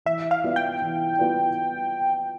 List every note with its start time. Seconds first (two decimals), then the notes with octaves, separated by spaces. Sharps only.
0.06 E3 E5
0.31 F5
0.44 B3 F4 B4 D5
0.56 G5
0.82 E3
1.19 B3 F4 B4 D5